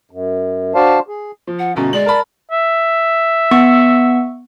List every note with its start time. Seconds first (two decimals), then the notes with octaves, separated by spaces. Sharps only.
0.11 F#2
0.75 D4 F#4 C5 D5 F5 A5
1.08 G#4
1.47 F3
1.59 F#5
1.76 G1 B2 C#4 A#5
1.93 G#3 D5 F#7
2.06 A#4 A5 B5
2.51 E5
3.51 B3 C#6